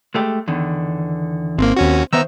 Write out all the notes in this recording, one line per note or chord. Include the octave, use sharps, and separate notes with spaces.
G#3 A3 G4
E2 D3 D#3
G#1 A#3 C4
D#2 C#4 F#4
D#3 B3 C5 E5 A#5 E6